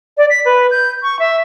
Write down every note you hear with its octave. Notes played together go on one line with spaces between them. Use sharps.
D5
B6
B4
G6
C#6
E5